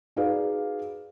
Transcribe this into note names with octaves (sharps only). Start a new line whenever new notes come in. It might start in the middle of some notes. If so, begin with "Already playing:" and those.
D#4 F#4 G#4 B4 D5 F5